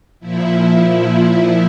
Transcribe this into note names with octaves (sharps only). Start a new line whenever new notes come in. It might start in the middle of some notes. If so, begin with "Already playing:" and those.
A#2 F3 E4